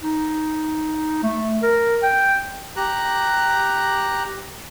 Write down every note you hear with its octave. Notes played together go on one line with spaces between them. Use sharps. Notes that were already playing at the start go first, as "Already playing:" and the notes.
D#4
A3
A#4
G5
G4 A#5 F#6